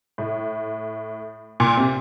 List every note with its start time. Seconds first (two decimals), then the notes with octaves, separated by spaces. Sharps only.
0.18 A2
1.60 A#2
1.77 C3